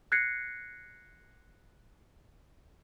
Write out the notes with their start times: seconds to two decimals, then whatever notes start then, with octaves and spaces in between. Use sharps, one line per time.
0.12 F#6 G#6 A#6 C7 C#7